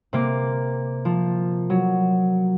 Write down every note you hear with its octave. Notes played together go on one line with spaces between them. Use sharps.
C3 A#3
F3
F#3